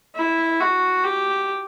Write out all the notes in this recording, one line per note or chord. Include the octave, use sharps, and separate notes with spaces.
E4
F#4
G4